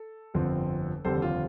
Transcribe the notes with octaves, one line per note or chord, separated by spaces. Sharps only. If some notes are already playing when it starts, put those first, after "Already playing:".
Already playing: A4
G1 F2 D3 F3 C4
F1 D#2 D3 G3 C4 A4 C5
F4